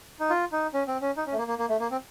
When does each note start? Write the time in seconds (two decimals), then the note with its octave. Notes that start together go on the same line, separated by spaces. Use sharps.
0.19 D#4
0.30 F4
0.52 D#4
0.73 C#4
0.87 C4
1.01 C#4
1.16 D#4
1.26 C#4
1.32 A3
1.37 A#3
1.48 A#3
1.58 A#3
1.69 A3
1.80 A#3
1.91 C4